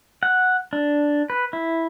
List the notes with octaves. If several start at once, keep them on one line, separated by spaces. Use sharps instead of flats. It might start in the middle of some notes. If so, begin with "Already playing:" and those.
F#5
D4
B4
E4